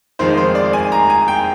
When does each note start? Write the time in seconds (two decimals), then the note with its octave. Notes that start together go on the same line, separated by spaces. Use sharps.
0.19 F2 D#3 G#3 C5
0.37 C5
0.55 D5
0.73 G#5
0.92 A#5
1.10 G#5
1.28 G5